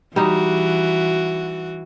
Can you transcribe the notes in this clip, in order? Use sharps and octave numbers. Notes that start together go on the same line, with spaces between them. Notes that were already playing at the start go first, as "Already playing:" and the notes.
E3 G3 D#4 F#4